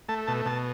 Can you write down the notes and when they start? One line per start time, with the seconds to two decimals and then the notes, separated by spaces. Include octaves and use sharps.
0.09 A3 A5
0.27 B2 A5
0.46 B2 A5